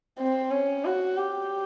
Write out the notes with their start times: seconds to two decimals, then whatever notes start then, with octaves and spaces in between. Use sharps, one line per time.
0.19 C4
0.51 C#4
0.84 F#4
1.17 G4